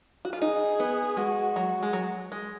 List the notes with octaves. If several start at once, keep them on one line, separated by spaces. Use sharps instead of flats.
F#4
F4
D#4 G#4
B3
G#3 F#4
F#3
G#3
F#3
G#3